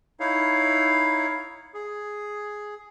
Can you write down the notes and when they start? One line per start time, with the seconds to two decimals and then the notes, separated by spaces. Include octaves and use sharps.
0.20 D#4 E4 C#5 F5
1.74 G#4